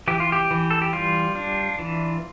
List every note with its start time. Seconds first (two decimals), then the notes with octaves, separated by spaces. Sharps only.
0.08 E3 G4
0.20 F4
0.32 G4
0.51 E3
0.71 A4
0.82 G4
0.93 G3 F4
1.36 D4
1.79 E3